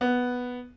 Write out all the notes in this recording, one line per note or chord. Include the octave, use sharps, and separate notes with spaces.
B3